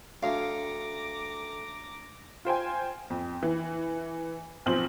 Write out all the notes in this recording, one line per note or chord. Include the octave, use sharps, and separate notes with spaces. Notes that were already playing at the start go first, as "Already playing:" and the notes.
D2 A4 E5 F5 G5 A#5 D6
F4 C5 G5 G#5
F2
E3
B1 F3 C4 C5 F#7